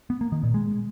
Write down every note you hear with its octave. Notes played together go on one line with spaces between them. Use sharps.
B3
A#3
D#3
A#2
G#3